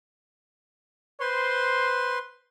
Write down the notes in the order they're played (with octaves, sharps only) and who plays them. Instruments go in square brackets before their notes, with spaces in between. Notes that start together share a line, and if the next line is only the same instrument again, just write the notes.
[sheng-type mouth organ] B4 C6 [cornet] C5